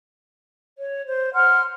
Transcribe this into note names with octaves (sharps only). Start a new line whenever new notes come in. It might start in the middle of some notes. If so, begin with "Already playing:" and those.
C#5
C5
F#5 C6 F6